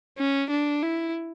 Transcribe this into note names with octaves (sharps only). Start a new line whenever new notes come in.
C#4
D4
E4